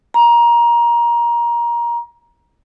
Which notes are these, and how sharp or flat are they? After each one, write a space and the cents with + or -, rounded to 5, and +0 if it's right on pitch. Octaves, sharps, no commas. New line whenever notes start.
A#5 +20